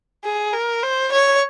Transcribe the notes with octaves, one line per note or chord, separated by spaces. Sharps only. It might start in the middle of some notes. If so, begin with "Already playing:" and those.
G#4
A#4
C5
C#5